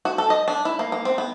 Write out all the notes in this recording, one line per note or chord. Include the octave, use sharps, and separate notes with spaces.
F#4
A4
D#5
D4
E4
A#3
A#3
C4
B3